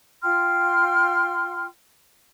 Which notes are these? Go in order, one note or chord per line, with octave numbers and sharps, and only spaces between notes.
F4 G5 C6 F6